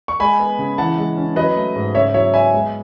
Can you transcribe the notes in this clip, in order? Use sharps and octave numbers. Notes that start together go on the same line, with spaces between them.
C#6
G#3 G#5 B5
B3
C#3
E3 F#5 A5
G#3
C#4
F#3 B4 D#5
A3
G#2
C#3 C#5 E5
F#3 C#5 E5
B3 E5 G#5
G#3